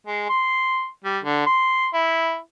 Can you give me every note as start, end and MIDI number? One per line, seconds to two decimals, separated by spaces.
0.07 0.27 56
0.29 0.87 84
1.05 1.18 55
1.24 1.42 50
1.46 1.87 84
1.94 2.37 64